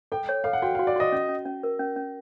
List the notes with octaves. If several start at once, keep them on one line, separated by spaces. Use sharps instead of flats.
A4 G5
C#5
A4 F5
F#5
F#4 G5
F5
F#4
D5
F#4 D#5
C#4
C#4
C#4
A#4
C#4
C#4